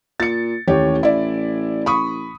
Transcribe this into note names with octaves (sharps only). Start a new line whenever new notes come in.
A#2 A6 C#7
A1 D#2 G4 C#5
E4 D5
B5 C#6 D#6